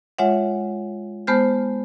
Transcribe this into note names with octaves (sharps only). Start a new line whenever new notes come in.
G#3 F4 C#5 E5 F#5
G#3 B3 C5 A5 F6 G6